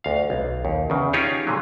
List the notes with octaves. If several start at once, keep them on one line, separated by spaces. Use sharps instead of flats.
D2 F5
B1
D#2
E2 C#3
C#4 D#4 F4 G4 G#4 C#5
A#2 D3 F#3